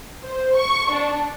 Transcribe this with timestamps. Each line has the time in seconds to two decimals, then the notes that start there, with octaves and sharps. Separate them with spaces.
0.25 C5
0.56 C#6
0.92 D4